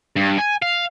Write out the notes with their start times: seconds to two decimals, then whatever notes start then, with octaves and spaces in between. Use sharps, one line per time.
0.16 G2
0.38 G#5
0.62 F5